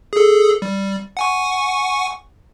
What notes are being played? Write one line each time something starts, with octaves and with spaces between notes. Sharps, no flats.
G#4 A4
G3
F#5 G#5 C#6